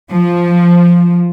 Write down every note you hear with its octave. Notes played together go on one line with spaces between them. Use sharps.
F3